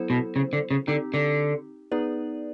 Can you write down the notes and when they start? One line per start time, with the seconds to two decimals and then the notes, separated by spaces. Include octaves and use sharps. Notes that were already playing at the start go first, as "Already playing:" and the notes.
Already playing: F#3 B3 E4 A4 C5
0.10 B2
0.36 C#3
0.53 D3
0.71 C#3
0.87 D3 C4 D#4 G4
1.14 D3
1.91 B3 D#4 G#4 B4 D5